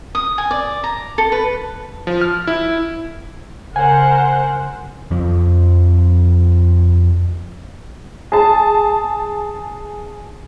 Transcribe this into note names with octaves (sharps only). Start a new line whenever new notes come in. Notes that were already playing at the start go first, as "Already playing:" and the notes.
D#6
G#5
D5
A#5
A4
B4
F3
F6
E4
C#3 A#4 C5 F#5 G#5
F2 F3
G#4 A5